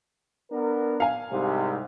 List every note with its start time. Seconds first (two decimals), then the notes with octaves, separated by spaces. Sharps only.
0.52 B3 D4 A#4
1.00 F5 G#5
1.32 C2 G#2 C3